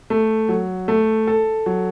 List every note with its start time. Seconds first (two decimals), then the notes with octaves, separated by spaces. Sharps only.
0.10 A3
0.49 F#3
0.88 A3
1.27 A4
1.66 F#3